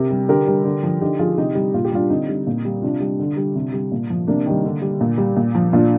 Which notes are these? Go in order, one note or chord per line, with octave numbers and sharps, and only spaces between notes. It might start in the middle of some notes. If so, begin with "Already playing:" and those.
Already playing: C3 G4 A#4
G3
D3 G4 A#4
G3
D3
F3
D3 D#4 G4
F3 F4 G#4
C3 D#4 G4
G3
A#2 F4
G4
G3 D4 F4
D3 C4 D#4
G3
A#2
G3
C3 D4 F4
G3
D3
G3
C3
G3
A#2
F3
C3 A#3 D4
D#3 G3
D3
G3
A#2
G3
A#2
F3
A#2 D4 F4